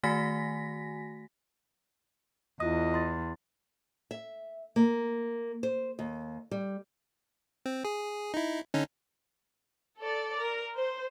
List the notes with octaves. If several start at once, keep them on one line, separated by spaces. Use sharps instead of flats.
D#3 A3 F#4 G#5 A#6 B6
E2 E4 F4 D#5 D#6
C6 A6
E5
A#3
C5
D#2
G3
C4
G#4
D#4 E4
D3 C#4 D#4
A4 D5
A#4
C5